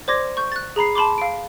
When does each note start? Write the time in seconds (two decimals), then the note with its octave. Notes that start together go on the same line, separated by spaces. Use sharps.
0.08 C5 D5 C6 D6 G#6 A#6
0.37 C#6 G6
0.52 F#6 A6
0.76 G#4 A#5 B5 C7
0.95 A5 B5 C6 D6
1.18 F5 D7